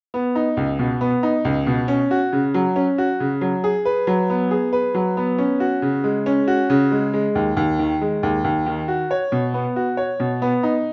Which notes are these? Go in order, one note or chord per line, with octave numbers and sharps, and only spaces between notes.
B3
D#4
C#2
B2
B3
D#4
C#2
B2
C#4
F#4
C#3
F#3
C#4
F#4
C#3
F#3
G#4
B4
F#3
B3
G#4
B4
F#3
B3
C#4
F#4
C#3
G#3
C#4
F#4
C#3
G#3
G#3
D#2
D#2
D#3
G#3
D#2
D#2
D#3
F#4
C#5
B2
B3
F#4
C#5
B2
B3
D#4